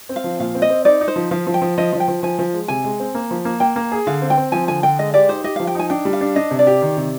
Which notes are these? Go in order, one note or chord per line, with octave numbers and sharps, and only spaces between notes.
C4
F5
F3
A#2 F5
C4
D#5
C4
D#4 D5
D#4
C5
F3
F3 F5
F3
G5
F3
F3 D#5
F3
G5
F3
F3 G#5
F3
G#3
C3 G#5
G#3
C4
A#3
F3
A#3
A#3 G5
A#3
G#4
D3 F5
C4
G5
C4
F3 G#5
D3 G#5
D3 G5
G#3 D#5
G4 D5
D#4 C5
G4 D#5
F3 F5
G5
D#4 G#5
D4 G5
G3
F5
D4
D4 D#5
C3
D5
G4
D#3
C3